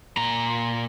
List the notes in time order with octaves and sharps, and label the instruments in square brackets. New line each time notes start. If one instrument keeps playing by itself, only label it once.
[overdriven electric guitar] A#2 A#5